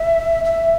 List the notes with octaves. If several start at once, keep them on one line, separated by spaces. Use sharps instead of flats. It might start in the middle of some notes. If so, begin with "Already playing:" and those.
Already playing: E5
E5